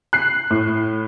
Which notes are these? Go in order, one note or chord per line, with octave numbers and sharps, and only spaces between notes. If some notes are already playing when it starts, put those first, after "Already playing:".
F#6 C7
A2